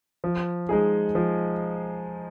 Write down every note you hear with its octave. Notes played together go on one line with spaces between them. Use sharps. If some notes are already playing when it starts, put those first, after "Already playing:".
F3
G#3 D#4 G#4
F3